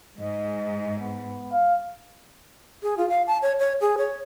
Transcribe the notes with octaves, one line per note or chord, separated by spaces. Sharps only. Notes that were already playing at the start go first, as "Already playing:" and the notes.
G#2 D#5
B3
F5
G#4
F4
F5
A5
C#5
C#5
G#4
C#5